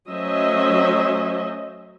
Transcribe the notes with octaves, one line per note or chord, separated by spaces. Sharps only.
F#3 A3 C#4 C5 D#5 E5